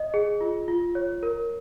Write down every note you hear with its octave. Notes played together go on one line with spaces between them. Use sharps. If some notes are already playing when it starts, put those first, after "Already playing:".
Already playing: D#5
G#4
F4
F4
C#5
A#4